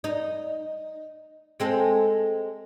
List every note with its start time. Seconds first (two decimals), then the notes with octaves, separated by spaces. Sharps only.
0.04 D#4
1.60 G#3 C4 A4